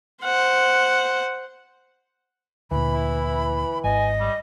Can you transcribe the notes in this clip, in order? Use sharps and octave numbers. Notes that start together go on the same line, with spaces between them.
C5 F#5
D2 A#2 E3 B5
E4
G#1 D#5 G#5
G3